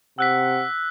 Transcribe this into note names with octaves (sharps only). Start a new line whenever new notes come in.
C3 F#5 E6 F#6 B6